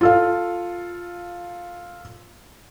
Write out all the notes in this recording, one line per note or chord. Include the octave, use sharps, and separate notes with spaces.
F4 A4 F5